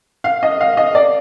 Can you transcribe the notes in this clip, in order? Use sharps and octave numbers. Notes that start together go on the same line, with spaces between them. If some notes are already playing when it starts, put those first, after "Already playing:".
F5
D#5
F5
D#5
D5